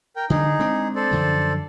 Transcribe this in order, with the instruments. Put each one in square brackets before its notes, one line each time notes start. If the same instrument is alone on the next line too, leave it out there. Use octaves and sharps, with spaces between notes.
[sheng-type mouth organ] A#4 G5
[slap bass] D3 D4 [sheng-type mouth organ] D#4 G#4
[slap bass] G#3 C4 D4
[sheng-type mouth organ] A4 C5 D5
[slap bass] F#2 D3 F3